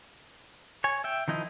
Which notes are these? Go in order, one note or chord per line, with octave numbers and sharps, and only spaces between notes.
C#5 G#5
E5 G5
D#3 F3 D#4 E4 D#5